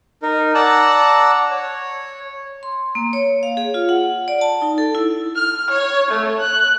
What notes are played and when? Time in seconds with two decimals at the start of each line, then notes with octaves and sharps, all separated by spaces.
0.22 D#4 A#4
0.54 D5 F#5 A5 A#5 E6 F#6
1.51 C#5
2.63 C6
2.95 A#3
3.13 C#5
3.43 F5
3.57 G#4
3.74 F4
3.89 F#5
4.28 D5
4.41 A5
4.62 D#4
4.78 A4
4.95 E4
5.35 F6
5.70 C#5
6.11 A3
6.40 F#6